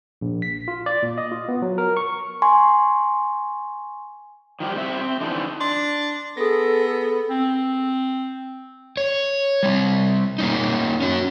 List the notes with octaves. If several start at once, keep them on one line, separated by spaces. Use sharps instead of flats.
A#1
B6
F4
D5
A#2
D#5
F4
B3
F#3
A#4
C#6
G#5 C6 C#6
D#3 F3 G3 G4
G3 C4 E5
C4
D3 E3 F3 D#4 A4
D4 C6
B3 G#4 A4 A#6
C4
C#5
G3 C4
A#3 C#4 D#4
C#4 F#4